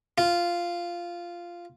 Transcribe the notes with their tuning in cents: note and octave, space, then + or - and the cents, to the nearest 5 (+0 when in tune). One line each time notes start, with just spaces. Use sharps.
F4 -5